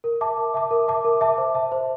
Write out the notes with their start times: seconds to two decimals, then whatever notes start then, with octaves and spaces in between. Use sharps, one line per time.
0.04 A#4
0.21 E5 A5 D6
0.38 A#4
0.54 E5 A5 D6
0.71 A#4
0.88 E5 A5 D6
1.05 A#4
1.21 E5 A5 D6
1.38 C5
1.55 E5 A5
1.72 C5